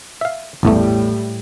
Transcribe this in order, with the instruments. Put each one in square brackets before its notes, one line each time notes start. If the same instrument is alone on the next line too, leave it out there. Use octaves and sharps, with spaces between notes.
[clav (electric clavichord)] E5 F5
[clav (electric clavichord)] A1 E2 A3 [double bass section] A2 G3